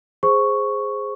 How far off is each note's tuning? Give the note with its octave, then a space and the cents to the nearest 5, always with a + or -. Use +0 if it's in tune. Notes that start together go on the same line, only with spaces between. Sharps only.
G#4 +0 C5 +0 C#6 +0